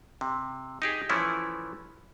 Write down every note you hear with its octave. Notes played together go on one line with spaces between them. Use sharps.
C3
D#4 G4 G#4
E3 F3 A3 C#4 E4